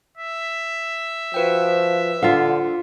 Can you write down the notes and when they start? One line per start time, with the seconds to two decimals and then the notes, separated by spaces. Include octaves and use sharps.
0.17 E5
1.34 F3 F#4 B4 G5
2.23 D3 F4 F5 F#5